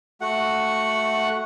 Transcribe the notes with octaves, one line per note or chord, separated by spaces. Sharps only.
A3 F#4 F#5